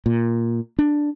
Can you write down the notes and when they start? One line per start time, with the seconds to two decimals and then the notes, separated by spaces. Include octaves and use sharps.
0.06 A#2
0.79 D4